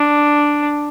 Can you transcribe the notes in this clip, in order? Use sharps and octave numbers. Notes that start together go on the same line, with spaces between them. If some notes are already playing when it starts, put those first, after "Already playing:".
Already playing: D4